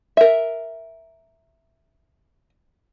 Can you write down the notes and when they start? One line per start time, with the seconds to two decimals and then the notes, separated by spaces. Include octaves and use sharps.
0.17 A#4 E5